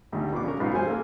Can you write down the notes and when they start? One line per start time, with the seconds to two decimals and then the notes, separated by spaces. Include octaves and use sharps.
0.12 G#1 D2 G3
0.33 B2 A#3 D4 D6
0.44 C#3 F#3 C#4 A#4
0.60 B1 G#2 B2 F#3 F4 F5
0.73 F#2 F#3 G3 C5 F5 G#5
0.87 A#3 G#4 A4